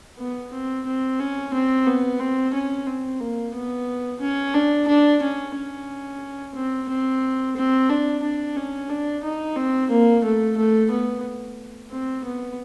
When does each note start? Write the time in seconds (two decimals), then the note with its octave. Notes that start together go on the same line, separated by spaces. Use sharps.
0.19 B3
0.53 C4
0.86 C4
1.20 C#4
1.54 C4
1.87 B3
2.20 C4
2.54 C#4
2.87 C4
3.20 A#3
3.55 B3
4.20 C#4
4.54 D4
4.88 D4
5.22 C#4
5.56 C#4
6.55 C4
6.89 C4
7.56 C4
7.90 D4
8.23 D4
8.56 C#4
8.89 D4
9.23 D#4
9.56 C4
9.90 A#3
10.24 A3
10.57 A3
10.91 B3
11.91 C4
12.25 B3